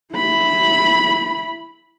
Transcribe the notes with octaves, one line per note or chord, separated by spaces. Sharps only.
E4 B5